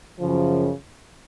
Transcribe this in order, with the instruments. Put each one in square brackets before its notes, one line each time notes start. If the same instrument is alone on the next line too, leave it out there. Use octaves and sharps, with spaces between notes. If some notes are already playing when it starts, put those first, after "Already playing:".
[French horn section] F#2 C#3 F3